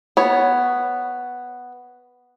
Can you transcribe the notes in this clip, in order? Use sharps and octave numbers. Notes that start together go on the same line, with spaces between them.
B3 C#5